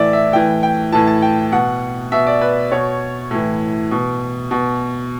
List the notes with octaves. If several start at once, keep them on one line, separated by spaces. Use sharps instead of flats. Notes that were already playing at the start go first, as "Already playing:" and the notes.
Already playing: A2 E3 D5 E5
E5
A2 E3 G5
G5
A2 E3 A5
A5
G5
B2 F#5
B2 E5
D5
B4
B2 C#5
A2 E3
B2
B2